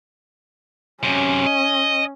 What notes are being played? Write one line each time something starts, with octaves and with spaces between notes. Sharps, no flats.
F#2 C3 C#4
D#5